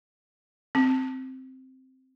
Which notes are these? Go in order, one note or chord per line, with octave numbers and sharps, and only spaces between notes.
C4